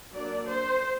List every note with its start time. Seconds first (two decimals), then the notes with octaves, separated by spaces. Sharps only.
0.14 F#3 A#3 D4 D5
0.49 C5